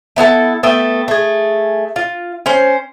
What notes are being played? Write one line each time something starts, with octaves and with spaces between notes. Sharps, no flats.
A3 B3 E4 A4
A3 B3 E5 G5
A3 G#4
F4
C#4 C5